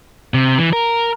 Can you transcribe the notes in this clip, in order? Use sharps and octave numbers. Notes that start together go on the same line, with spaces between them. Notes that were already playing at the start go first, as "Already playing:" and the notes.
C3
E3
A#4